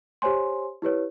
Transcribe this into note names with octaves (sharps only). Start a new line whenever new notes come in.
G4 C5 C#5 G#5 C6
E4 G4 B4 C#5